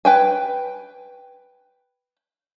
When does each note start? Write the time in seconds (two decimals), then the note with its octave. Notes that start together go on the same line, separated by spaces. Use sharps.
0.05 B4 G5 G#5